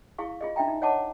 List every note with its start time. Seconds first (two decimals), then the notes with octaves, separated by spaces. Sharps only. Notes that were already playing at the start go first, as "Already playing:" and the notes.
0.18 E4 G#4 F5 C#6
0.41 F4 G#4 D#5
0.56 D4 F4 E5 G5 A#5
0.68 D#4
0.82 C#5 D#5 F#5 A5 D6